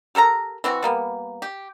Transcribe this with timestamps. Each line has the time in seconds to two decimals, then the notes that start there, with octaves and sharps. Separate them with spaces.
0.15 G4 A4 A#4 A#5
0.64 E3 C4 F#4
0.83 G3 A#3 B3
1.42 G4